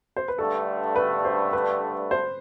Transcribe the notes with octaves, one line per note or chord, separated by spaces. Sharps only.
C5
B4
G2 D3 A3 A4
B4
C5
B4
C5